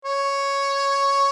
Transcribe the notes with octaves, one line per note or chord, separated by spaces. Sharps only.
C#5